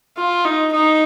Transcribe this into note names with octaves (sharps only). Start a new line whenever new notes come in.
F4
D#4
D#4